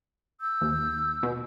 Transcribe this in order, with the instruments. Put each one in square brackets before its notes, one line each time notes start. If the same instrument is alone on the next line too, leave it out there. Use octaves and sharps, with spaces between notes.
[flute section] E6 G6
[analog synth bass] D#2
B2